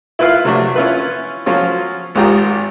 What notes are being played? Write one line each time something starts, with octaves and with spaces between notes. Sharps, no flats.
E4 F4 B4 E5 F5
C3 F#3 A3 D4
C#4 E4 F4 B4
F3 F#3 C#4 F4
G#1 G#2 F4 G4 A#5 D#6